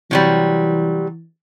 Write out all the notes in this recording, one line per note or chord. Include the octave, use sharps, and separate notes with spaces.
C3 E3 F#3 G3